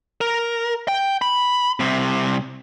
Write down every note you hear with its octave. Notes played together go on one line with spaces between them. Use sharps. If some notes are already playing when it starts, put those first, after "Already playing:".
A#4
G5
B5
C2 C3